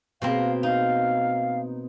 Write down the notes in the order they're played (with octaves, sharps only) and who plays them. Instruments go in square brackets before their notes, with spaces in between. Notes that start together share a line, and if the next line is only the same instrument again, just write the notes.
[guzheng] B2 A#3 C4 [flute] F5
[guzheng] D#4 [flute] F5